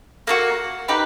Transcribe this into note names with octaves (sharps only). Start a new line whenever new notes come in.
A#3 D4 F#4
D#4 G4 B4